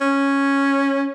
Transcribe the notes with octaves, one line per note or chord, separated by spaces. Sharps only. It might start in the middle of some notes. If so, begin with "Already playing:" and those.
C#4